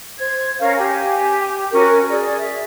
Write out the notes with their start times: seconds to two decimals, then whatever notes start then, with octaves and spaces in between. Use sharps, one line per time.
0.19 C5 G#6
0.60 C#4 A#4 C#5 F5
0.77 G4 G#5
1.72 C#4 F#4 A#4
2.09 G#4 D5
2.38 E5